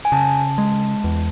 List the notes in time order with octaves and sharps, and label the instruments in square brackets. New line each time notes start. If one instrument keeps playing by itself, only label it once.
[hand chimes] G#5
[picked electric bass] C#3 [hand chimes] A5
[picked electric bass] G#3
E2